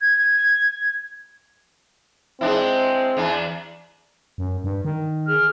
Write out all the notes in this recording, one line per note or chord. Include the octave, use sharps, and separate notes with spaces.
G#6
G#3 C4 D4 E4
E2 D4
F#2
G2
D#3
G#4 F6